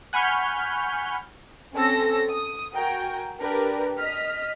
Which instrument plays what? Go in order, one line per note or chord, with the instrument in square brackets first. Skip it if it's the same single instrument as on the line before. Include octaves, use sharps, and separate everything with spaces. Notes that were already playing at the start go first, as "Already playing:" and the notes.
[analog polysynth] F#5 G#5 B5 C#6 F6 G6
[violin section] C4 C#4 A4 A5 E6 A#6
D#6
F#4 A#4 G5 G#5 A#5
D4 G4 A#4 B4
D#5 F6 B6